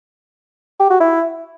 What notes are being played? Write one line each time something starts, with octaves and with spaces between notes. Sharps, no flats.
G4
F#4
E4